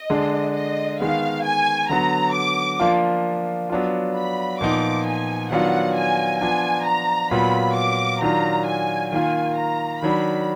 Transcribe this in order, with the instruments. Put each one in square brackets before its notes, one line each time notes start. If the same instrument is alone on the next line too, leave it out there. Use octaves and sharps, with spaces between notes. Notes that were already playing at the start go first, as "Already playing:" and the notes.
Already playing: [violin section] D#5
[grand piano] D3 G#3 D4
[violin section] D#5
[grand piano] D#3 G#3 B3 [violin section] F5
[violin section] G#5
[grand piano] D3 F#3 B3 [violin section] A#5
[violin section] D6
[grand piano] F3 A#3 D4 F4
F#3 B3 D4 F4
[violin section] B5
[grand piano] A#2 F3 B3 D#4 [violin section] D6
[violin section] G#5
[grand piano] D#3 F#3 B3 D4 F4 [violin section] F#5
[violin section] G#5
[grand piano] F3 B3 D4 F4 [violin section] G#5
[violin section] A#5
[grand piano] A#2 F#3 B3 F4 [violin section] B5
[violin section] D6
[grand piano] D#3 F#3 D4 F4 [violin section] A#5
[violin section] G#5
[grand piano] D#3 A#3 F4 [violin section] G#5
[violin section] A#5
[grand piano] D#3 F#3 D4 [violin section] B5